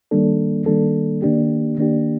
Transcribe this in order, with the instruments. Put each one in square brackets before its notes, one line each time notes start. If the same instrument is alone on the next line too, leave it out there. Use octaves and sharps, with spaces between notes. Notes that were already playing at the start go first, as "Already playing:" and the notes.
[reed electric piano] D#3 G3 A#3 D4 A4
D#3 G3 A#3 D4 A4
D#3 A#3 D4 G4
D#3 A#3 D4 G4